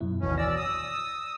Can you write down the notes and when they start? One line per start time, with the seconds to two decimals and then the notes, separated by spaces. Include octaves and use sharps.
0.01 F#2 B2 E4
0.21 G#1 D#2 B2 E3 C#4
0.38 D5 E6 A#6
0.56 D#6 E6